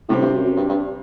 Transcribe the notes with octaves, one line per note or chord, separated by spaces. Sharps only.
A2 C3 G3 C4
G2
F#2
F#2
G2
G2